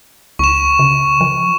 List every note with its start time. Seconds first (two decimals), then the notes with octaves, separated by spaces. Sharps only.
0.39 C#2 C#6 E7
0.79 C#3
1.21 F3